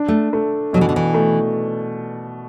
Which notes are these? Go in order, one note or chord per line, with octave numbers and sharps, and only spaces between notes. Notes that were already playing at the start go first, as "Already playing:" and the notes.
Already playing: D4
A3
A3
B2 F#3
E3
D3
E3
A3